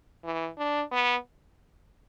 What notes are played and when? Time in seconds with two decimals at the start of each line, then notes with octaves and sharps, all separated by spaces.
0.24 E3
0.58 D4
0.92 B3